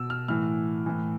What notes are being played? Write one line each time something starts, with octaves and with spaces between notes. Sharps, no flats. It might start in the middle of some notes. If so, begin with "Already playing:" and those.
Already playing: B2 E6
F6
A2 E3 F6
A2 E3